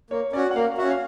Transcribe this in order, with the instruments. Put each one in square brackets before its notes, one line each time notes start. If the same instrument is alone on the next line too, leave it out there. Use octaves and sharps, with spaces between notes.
[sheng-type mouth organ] A#3 [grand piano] C#5
[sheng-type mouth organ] C#4 F#4 [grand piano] D5
[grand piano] F#5
[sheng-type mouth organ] A#3 [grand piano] F5
[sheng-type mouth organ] C#4 F#4 [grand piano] E5
[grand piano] F5